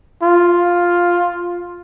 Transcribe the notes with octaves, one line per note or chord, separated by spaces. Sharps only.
F4